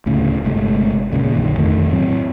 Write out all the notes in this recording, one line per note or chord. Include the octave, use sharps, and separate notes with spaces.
D2 A2 C#3
G1 C3 G#3 A3
D#2 A#2 C#3
A#1 F#2 D3 D#3
E1 F2 D#3 A3
A2 F#3 C4